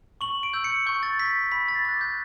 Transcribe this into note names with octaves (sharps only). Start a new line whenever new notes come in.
C#6 F#7
D7
E6 G6
C#7
C#6 G6
A6
E6 G6 B6
B5 B6
A6
D6 F#6 A6
G6